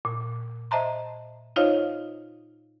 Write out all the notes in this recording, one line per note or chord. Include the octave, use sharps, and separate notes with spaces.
A#2
C5 D#5 E5 A5 A#5 C6
D#4 F4 C5 C#5 D#5 F5